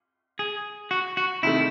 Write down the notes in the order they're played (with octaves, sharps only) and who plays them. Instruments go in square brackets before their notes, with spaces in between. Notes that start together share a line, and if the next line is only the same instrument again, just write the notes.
[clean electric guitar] G#4
F#4
F#4
[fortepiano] C3 D#3 A3 [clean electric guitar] E4